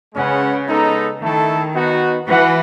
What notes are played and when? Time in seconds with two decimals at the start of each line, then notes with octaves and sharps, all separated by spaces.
0.14 C#3 G#3 C#4 G#4 B4 F#5
0.67 G#3 B3 D#4 A4
1.20 D#3 A3 E4 A4
1.74 B3 D#4 F#4
2.27 E3 F#4 B4 F#5